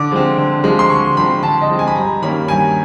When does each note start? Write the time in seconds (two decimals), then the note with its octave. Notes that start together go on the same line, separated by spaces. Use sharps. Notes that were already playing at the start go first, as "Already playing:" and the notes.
Already playing: D3 D6
0.11 F3 G#3 C4
0.38 D3
0.64 F3 G#3 C4
0.79 C6
0.90 D3 C#6
1.17 F3 G#3 C4 B5
1.43 D3 A5
1.61 D#5
1.69 F3 G#3 C4
1.79 G#5
1.87 B5
1.96 G2 A#5
2.22 D#3 G3 A#3 C#4 B5
2.48 G2 G#5